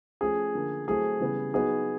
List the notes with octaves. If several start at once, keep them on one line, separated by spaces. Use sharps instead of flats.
F3 A3 C#4 G#4
D3 F3 A#3
F#3 A3 C4 E4 G#4
C#3 E3 G3 B3
F#3 B3 D#4 F#4 G#4